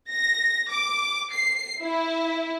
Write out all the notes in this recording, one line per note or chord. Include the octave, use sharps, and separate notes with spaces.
A#6
D6
C7
E4